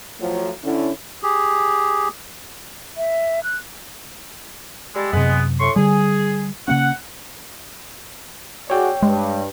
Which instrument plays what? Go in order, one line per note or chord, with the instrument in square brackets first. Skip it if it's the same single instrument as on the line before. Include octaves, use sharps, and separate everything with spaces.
[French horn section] A2 F3 F#3
D3 C#4 E4
[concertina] G4 G#4
[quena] E5
F#6
[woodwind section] G3 G#3 A4
[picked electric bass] F#2 C3 [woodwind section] G#3 B3
[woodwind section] A2 C6 C#6
[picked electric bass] D3 G3 [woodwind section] G#4
[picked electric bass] C#3 A#3 C#4 [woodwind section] F#5
[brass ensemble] F#4 G#4 D5 [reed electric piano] C#5 G5
[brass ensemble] G2 [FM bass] G#3